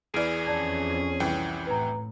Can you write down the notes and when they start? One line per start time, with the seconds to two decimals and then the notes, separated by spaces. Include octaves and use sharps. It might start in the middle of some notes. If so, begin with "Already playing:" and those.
0.14 E2 E3 G#4 D5 F6 D7
0.47 F2 C#4 D5 A5 G#6
1.20 C2 E3 G5
1.67 A2 B4 A#5